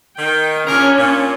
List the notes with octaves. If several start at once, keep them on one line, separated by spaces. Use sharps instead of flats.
D#3 G5
A#2 C#3 C#4 D4 A#4 C#5
A#2